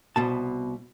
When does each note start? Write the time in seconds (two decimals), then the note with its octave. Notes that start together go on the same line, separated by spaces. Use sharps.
0.16 C2 B2 A5